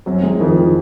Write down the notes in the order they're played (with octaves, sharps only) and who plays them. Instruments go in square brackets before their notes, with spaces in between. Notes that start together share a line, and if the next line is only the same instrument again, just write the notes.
[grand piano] F#2 F#3 [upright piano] C4
[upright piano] G#3
[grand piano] F2 F3 [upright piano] D#3
[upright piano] D#3